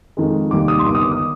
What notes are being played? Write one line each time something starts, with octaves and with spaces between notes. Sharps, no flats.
F2 D#3 G#3
F1 D#2 D#3 G3 D6
D#6
C6
G1 G2 D#3 D6
D#6
D6
D#6